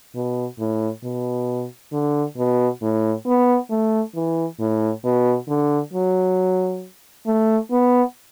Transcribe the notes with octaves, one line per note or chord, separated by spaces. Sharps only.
B2
A2
B2
D3
B2
A2
B3
A3
E3
A2
B2
D3
F#3
A3
B3